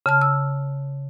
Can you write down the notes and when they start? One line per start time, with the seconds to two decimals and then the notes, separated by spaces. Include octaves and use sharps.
0.06 C#3 A5 F6
0.21 E6